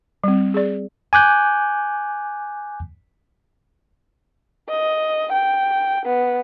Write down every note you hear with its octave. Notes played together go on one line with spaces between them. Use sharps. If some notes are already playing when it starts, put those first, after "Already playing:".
G3 C4
G#4 D5
G#5 D6 F#6 G6
D#5
G5
B3